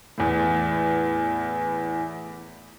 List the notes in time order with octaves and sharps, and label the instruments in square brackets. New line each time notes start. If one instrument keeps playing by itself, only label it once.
[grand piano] E2 A2